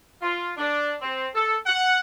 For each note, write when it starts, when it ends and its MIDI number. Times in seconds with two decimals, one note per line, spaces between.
0.22 0.50 65
0.57 0.92 62
1.01 1.27 60
1.35 1.55 69
1.66 2.00 78